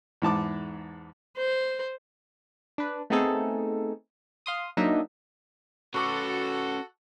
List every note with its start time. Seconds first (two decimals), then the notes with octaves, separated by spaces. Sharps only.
0.22 E2 G#2 A5 D6
1.37 C5
2.78 D4 B4
3.10 A3 B3 C4 D#4 G#4 A4
4.46 F5 C6 D#6
4.77 F#3 A#3 D4 D#4 D#5 E5
5.94 C#4 F#4 A4 B4 C#6 D6